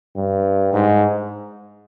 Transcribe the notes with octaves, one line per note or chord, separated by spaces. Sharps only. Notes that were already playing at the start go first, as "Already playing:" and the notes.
G2
G#2